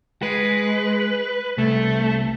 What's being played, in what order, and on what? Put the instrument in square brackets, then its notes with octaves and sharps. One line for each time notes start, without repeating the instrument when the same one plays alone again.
[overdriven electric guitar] G#3 [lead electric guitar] B4
[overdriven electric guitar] C2 [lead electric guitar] A3